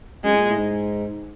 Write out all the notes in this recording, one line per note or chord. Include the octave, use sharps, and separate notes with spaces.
F#2 G#3
A2
A#2
A2
G#2